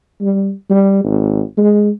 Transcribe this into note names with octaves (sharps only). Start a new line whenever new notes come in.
G3
G3
G#1
G#3